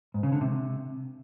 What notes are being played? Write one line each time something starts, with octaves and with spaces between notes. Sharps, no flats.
G#2
C#3
D3
C3